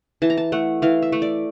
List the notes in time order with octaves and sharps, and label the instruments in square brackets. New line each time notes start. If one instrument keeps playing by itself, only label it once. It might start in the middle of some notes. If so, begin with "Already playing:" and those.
[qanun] E3 A5
A#5
A5
A3 F#5
E3 F5
E5
A3
D5